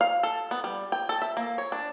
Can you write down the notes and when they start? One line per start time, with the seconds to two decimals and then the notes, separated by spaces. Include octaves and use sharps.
0.01 F5
0.23 A4
0.51 B3
0.64 G3
0.92 G5
1.09 A4
1.22 E5
1.37 A#3
1.58 C#5
1.72 D4